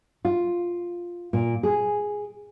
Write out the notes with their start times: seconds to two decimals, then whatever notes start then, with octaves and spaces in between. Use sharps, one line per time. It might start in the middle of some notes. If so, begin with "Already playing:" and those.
0.25 F4
1.33 A#2
1.63 G#4